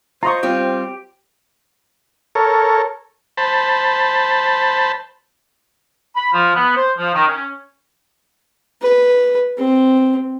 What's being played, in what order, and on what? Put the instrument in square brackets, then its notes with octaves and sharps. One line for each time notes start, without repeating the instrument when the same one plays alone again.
[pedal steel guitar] F4 D#5 [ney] C5 [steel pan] A#5 C6 C#6
[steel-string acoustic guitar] G3 C4 F4 [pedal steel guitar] G4
[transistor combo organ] A4 A#4 C#5
C5 A5 B5
[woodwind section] B5
F3
B3
C5
F3
D#3
C#4
[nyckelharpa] B4
C4